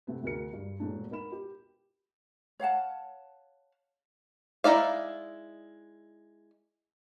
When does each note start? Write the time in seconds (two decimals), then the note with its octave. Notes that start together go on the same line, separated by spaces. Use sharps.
0.07 C3 A3 B3
0.24 D2 F#4 G#4 A#4 C#7
0.53 G2
0.80 E1 A#2 A3 D4
1.10 B3 D#4 A#4 B5 E7
1.32 G4
2.60 C#5 F5 F#5 A5
4.64 G#3 D#4 E4 D5 F5